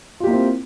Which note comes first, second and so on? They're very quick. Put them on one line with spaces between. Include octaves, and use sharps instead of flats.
F4 G4 A#3 E4 C4